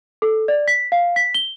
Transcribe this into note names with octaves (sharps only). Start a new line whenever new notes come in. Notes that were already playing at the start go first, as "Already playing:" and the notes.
A4
D5
B6
F5
B6
G7